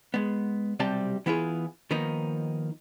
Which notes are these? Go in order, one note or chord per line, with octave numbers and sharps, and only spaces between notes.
G#3 B3
B1 C3 G3 C4 G4 A5
E3 B3 E4 F4 G#4
D#3 F3 A#3 B3 D#4